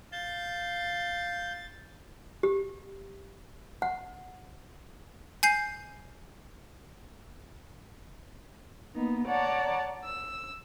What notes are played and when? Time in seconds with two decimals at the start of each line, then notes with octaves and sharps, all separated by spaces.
0.12 F5 G6 A6
2.43 G4
3.82 F#5
5.43 G#5 G6 C7
8.94 A#3 B3 D#4
9.27 C#5 D5 F#5 A5 A#5
10.04 E6